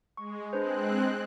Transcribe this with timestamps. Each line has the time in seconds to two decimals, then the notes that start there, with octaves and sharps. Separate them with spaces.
0.17 G#3 C#6
0.53 G#3 C4 D4 B4 C5 F#6